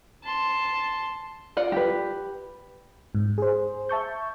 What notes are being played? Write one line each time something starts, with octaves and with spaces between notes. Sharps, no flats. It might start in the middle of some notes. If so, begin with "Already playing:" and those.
A5 C6
F4 D5 F#5
G4 B4
G#2
G#4 C5
E5 A5 C#6 G6